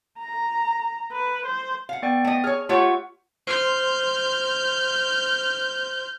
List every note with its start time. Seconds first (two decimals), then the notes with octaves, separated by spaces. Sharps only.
0.19 A#5
1.12 B4
1.46 C5
1.89 F5 F#5
2.03 B3 D5 G5
2.25 A3 D#5
2.44 G#4 C#5 F6
2.69 A3 F4 G4 C#5 F#5 C#6
3.47 C5 C6 F6 G6